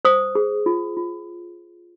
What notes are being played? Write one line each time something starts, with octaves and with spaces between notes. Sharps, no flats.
C5 D#6
G#4
F4
F4